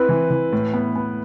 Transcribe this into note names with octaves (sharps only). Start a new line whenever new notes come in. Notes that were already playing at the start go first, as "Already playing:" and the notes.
Already playing: C4 E4 B4
E3
E3
A2
B3
B3